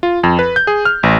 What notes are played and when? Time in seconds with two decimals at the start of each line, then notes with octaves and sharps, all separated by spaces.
0.03 F4
0.23 F2
0.39 B4
0.56 G6
0.67 G#4
0.85 F6
1.03 A1